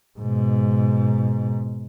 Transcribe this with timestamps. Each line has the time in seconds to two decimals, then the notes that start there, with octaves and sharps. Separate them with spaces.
0.19 G#2 B2